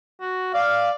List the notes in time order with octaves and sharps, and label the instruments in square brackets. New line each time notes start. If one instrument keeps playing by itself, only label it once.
[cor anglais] F#4
[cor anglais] D5 [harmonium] F5